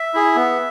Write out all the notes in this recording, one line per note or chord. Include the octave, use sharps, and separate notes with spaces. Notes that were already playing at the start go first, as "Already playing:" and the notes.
Already playing: E5
E4 G#4
B3